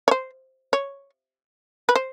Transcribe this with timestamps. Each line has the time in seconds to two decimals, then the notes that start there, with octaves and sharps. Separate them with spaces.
0.08 C#5
0.11 C5
0.73 C#5
1.89 B4
1.96 C5